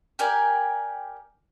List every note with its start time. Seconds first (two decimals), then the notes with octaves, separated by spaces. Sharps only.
0.19 G4 A#4 D5 G#5